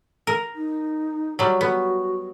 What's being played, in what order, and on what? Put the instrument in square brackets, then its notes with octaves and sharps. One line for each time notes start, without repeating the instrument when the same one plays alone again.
[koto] A#4
[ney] D#4
[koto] F#3 G3 [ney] F#4
[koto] B3